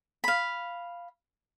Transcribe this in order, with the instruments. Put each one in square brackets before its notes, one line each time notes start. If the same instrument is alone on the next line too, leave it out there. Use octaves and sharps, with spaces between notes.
[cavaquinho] F5 B5